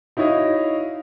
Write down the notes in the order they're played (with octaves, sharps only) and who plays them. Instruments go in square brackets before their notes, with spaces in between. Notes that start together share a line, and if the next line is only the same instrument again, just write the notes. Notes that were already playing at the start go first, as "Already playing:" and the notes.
[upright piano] D#4 E4 F#4 C#5 D#5 F5